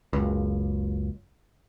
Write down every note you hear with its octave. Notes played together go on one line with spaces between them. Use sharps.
F#1 C#2